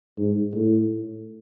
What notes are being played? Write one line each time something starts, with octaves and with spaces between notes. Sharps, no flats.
G#2
A2